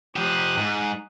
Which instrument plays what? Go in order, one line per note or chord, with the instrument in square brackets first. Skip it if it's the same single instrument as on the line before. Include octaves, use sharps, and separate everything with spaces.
[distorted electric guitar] F3 G4 [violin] D#6 F#6
[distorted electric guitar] G#2